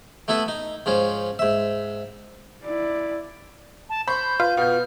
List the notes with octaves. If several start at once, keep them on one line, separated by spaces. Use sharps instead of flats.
A3 B3 E4 A4 B4
D#4
G#2 F3 C#4
G#2 E5
E4 D5
A5
C5 B5 C#6 G6
F4 B4
B2 B3 F6 G6